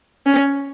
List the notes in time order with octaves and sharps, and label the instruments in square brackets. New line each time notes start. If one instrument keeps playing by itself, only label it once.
[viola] C#4